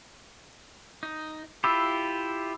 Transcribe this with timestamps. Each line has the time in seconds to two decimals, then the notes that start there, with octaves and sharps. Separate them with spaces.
1.03 D#4
1.64 E4 F4 G4 B5 E6